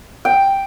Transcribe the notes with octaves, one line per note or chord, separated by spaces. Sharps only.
G5